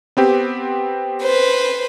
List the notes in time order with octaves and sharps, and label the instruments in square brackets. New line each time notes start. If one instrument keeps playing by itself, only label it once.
[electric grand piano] B3 C4 G4
[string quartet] B4 C5